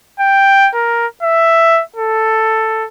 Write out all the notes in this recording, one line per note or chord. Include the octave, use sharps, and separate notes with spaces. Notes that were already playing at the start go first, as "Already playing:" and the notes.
G5
A#4
E5
A4